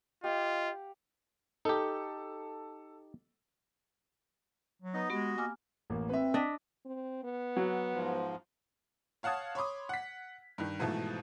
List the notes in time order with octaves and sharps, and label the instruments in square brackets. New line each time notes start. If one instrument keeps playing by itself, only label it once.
[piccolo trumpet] F4 [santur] G4 F5 F#5 [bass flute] D#5
[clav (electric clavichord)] D#4 G4 [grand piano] A4
[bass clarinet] F#3
[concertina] B3 D#4 [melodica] D#5
[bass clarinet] G#3 [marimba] B3 G4 [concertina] F#4
[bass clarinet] A#3 [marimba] G#5 D6 F6
[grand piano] A1 A#3
[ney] C4 [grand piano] B4 E5
[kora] D4 D#5 [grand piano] B6
[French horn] C4
B3
[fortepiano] F#3
[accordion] G#2 F3
[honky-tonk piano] C#5 F5 F#5 A5 D#6 G#6
C#5 B5 C6 D6 D#6
F#5 B6
G2 D#3
G#2 B2 E3 F3 A3